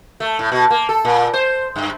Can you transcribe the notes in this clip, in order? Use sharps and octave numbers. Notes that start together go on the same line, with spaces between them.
A3
A2
B2
A#3
A4
A#2
C5
G2